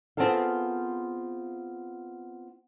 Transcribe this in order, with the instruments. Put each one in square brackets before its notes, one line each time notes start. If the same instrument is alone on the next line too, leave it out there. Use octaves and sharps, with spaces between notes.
[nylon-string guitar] B3 C4 F4 G#4 A4 F5